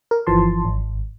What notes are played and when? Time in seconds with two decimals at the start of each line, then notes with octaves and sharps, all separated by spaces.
0.11 A#4
0.27 G1 E3 F3 A5 C6
0.65 G#1